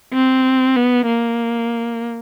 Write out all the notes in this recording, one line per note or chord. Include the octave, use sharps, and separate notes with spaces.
C4
B3
A#3